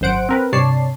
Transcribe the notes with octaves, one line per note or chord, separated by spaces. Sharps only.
G#1 F#2 C5 F#5 D7
C4 A#4 B4
G2 C3 C#5 D5 A5 C7